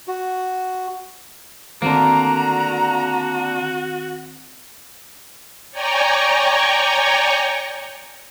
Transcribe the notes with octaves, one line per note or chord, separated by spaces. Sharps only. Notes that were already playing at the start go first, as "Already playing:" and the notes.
F#4
D3 D#3 A#3 C4 F#4 A#5
C#5 D5 G5 G#5 A#5 C#6